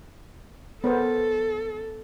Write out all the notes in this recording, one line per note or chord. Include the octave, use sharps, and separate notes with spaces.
B3 A4 A#4 C5